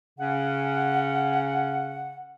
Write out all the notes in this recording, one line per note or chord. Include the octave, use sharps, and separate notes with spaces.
C#3 C#4 F#5